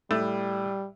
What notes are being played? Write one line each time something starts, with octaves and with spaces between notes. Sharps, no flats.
A2 G3 A3